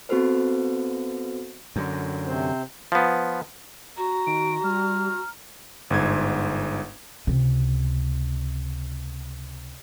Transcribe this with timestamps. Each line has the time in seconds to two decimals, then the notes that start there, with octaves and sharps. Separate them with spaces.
0.09 B3 C4 F#4 A4 B4 C5
1.76 F#2 D3
2.28 C3 C4 C5
2.92 F3 B3
3.97 F#4 A#5
4.27 D#3 D7
4.64 G3 F6
5.90 G1 G#2 G#6
7.27 C#2 C3